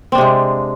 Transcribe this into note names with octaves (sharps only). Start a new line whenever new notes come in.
C3 G#3 C4 D4